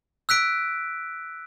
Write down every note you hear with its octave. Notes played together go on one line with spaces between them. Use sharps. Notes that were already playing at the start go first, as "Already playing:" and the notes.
E6 F#6 B6 D7